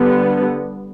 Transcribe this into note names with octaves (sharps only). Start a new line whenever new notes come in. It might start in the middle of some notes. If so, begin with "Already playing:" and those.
Already playing: D3 G3 B3